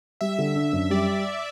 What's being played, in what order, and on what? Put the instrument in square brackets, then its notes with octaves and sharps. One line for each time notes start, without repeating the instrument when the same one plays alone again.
[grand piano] G3 [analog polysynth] E5
[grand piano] D3
D4
F#2
[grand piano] G3 [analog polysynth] D5